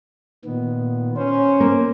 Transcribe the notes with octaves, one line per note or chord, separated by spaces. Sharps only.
A#2 D#3 B3
C#4 C5
A#3